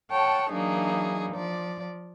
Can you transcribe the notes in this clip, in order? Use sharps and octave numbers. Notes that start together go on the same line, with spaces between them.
A4 C#5 F#5 G5 A5
E3 F#3 A#3 D4 D#4 G#4
F3 D5